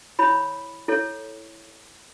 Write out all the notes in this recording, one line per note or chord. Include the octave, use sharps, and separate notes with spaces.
E4 C#5 B5
E4 A4 C#5